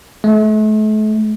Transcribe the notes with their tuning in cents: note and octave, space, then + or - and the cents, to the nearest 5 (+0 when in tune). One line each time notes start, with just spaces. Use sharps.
A3 -40